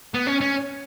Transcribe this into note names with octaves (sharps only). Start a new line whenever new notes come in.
B3
C#4
C#4